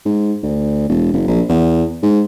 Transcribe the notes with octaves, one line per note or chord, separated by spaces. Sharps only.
G#2
D2
E1
F#1
A#1
E2
G#2